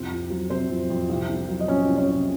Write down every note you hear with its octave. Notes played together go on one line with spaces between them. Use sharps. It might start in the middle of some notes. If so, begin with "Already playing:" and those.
Already playing: C2 F2 C4 C5
F2
F#3
C3 C4 C5
F2
F2
C2
C2
F#3
D#5
A#2 C#4 C#5
C2
C#4 C#5
C2